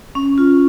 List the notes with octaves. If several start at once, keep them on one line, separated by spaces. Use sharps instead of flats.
C#4
F4